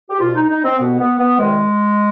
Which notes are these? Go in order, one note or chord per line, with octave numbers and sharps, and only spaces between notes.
G4
C2 B2 F4
D#4
D#4
C4
C2 B2 B3
B3
B3
C2 C3 D#3 G#3